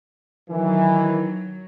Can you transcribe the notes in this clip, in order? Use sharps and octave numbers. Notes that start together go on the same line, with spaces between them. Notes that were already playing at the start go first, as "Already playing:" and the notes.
D#3 E3 F#3